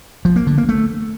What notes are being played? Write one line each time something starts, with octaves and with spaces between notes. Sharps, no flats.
F3
A#3
D3
A#3
A3